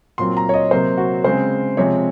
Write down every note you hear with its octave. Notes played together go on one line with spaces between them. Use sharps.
A#2 F#3 C4 C6
A#5
C#5
D#5
C3 F#3 A#3 C5
F#4
C#3 G#3 C4 C5
C3 F3 G#3 C4 C#5